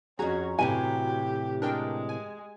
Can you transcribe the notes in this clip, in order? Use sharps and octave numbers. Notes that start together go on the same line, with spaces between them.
F2 C#4 F#4 G#4 A#5 G#6
A2 C3 E3 G4 G#5
G#3 D4 A#4 G5
G#5